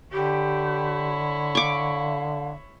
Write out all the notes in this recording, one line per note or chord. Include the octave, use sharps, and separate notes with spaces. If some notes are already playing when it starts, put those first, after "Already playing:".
D3 E4 G4 C#5
F5 C#6 D6